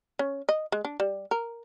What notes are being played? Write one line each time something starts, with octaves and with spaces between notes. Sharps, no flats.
C#4
D#5
G#3
D4
G3
A#4